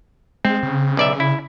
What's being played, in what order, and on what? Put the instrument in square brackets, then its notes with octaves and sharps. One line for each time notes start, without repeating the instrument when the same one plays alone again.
[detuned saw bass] G#3 [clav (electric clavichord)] C4
[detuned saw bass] C#3
[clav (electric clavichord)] B1 D5 E5
E4